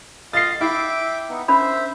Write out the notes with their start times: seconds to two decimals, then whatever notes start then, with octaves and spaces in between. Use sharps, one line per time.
0.33 F4 D#5 F5 A6 C7
0.61 E4 E5 G5 D6
1.29 B3 D#4
1.48 C#4 D4 C5 E5 B5